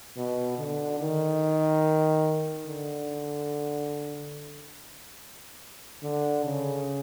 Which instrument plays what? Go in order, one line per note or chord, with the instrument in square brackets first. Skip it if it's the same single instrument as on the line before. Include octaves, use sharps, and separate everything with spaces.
[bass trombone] B2
D3
D#3
D3
D3
C#3